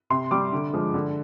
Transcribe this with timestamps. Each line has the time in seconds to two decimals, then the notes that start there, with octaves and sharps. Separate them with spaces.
0.10 C3 C6
0.31 G3 D6
0.53 D3
0.73 F3 G#3
0.94 D3